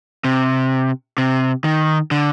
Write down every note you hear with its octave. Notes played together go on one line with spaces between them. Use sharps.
C3
C3
D#3
D3